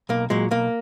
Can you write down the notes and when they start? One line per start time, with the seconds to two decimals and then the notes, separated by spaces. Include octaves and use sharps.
0.09 B1 A#3
0.30 A#2 F#3 G#3
0.51 B1 A#3